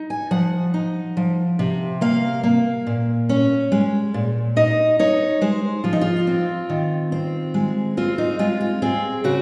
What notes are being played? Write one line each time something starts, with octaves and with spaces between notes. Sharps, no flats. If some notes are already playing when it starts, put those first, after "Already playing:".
Already playing: D#4
G#5
F3 F#5
D#4
F3
C3
A#3 F5
A#3
A#2
C#4
G#3
A#2
D#4 D#5
D#4 C#5
G#3 C5
F3 F4
D#4
F4
C4
D#3
C4
G#3
C4 F4
D#4
G#3 F4
F4
C4 G#4
C#3 F#4